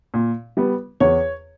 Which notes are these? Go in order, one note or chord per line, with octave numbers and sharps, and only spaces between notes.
A#2
G3 B3
E2 C#5